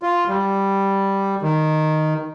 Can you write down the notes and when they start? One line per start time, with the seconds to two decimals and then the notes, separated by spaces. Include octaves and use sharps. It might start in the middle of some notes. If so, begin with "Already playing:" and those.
0.03 F4
0.29 G3
1.42 D#3